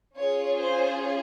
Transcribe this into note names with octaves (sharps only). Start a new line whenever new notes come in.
C#4 F4 G#4 C#5
C5